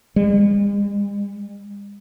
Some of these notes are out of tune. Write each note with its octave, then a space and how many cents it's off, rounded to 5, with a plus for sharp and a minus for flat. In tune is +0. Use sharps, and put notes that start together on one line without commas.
G#3 -45